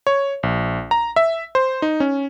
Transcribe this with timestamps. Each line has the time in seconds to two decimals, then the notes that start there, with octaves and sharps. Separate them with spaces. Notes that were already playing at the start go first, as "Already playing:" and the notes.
0.07 C#5
0.43 A#1
0.91 A#5
1.16 E5
1.55 C5
1.82 D#4
2.00 C#4